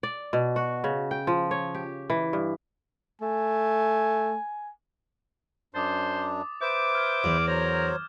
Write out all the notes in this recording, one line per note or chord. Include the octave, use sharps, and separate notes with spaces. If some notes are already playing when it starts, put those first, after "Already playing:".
D5
B2
F#4
C#3
G5
F3
C#5
G4
E3
G2
A3 G#5
F#2 D4 C5 D6 D#6 A6
B4 C5 E5 D6 G6 E7
F6 G#6
E2
F#3 A#4 C5 C#5